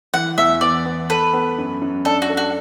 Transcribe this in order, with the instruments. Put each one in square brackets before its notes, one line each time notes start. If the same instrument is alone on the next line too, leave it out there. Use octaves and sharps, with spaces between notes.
[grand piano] E3 [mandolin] F#5
[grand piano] E2 [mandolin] E5
[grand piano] B3 [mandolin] D5
[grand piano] B3
[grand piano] A4 [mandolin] B4
[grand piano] B3
F#2
F#2
[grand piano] D4 [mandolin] A4
[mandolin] F#4
[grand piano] A4
[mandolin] F#4